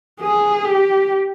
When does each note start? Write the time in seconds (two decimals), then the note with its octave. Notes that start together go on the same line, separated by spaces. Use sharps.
0.20 G#4
0.64 G4